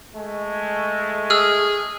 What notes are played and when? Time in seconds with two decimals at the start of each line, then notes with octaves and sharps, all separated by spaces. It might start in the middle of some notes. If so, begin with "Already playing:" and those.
0.13 G#3 A3
1.30 G#4 E6 F6